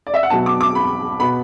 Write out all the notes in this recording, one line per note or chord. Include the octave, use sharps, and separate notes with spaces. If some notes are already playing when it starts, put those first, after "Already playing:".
D5
E5
F#5
B2 F#3 B3 A5
D6
D6
B5
B2 B3 B5